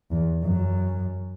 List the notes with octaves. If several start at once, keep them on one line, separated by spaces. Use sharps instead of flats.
E2
F#2